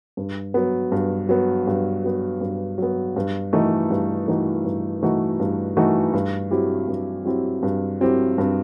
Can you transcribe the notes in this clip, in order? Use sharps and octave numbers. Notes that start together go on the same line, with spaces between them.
G2
F#3 B3
G2
F#3 B3
G2
F#3 B3
G2
F#3 B3
G2
E3 A3 D#4 F#4
G2
E3 A3 D#4 F#4
G2
E3 A3 D#4 F#4
G2
E3 A3 D#4 F#4
G2
F#3 C4 E4 G4
G2
F#3 C4 E4 G4
G2
F#3 C4 E4 G4
G2